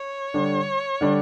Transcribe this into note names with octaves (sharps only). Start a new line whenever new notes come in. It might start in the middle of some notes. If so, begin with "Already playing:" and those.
Already playing: C#5
D3 G3 D4
D3 G3 D4